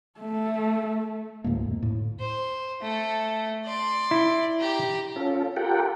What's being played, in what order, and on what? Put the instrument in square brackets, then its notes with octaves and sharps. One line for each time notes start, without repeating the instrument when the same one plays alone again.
[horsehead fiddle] A3
[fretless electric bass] D2 A2 G#3 A#3
F2
A2
[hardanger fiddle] C5
A3 A4
D5 C6
[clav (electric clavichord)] E4
[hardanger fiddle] G4 A#5
[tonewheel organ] C#4 F4 A4
F4 G4 A4 A#4 F#5 G5